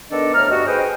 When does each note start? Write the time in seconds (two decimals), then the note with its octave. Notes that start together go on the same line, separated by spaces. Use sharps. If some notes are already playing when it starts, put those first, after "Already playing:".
0.11 D#3 B3 D4 A4 D5 D#5
0.34 D2 A2 A#5 F6
0.50 G2 F#4 D#5
0.67 G#4 B4 C5 D#5 G5